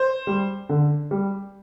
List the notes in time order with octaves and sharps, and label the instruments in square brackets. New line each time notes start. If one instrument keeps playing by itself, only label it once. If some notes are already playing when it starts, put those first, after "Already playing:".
Already playing: [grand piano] C5
G3
D3
G3